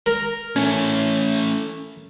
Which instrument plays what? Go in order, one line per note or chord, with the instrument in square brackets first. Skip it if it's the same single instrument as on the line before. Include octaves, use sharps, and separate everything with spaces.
[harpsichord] A#4
[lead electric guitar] E3 A3 [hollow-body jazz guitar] C#4